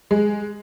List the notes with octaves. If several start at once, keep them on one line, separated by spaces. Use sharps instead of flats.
G#3